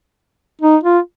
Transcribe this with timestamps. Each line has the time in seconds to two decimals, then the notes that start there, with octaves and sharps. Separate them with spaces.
0.62 D#4
0.84 F4